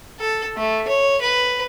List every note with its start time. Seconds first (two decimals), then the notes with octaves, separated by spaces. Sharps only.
0.19 A4
0.57 A3
0.88 C#5
1.21 B4